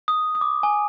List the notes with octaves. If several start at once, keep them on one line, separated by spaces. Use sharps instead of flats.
D#6
D#6
D6
G#5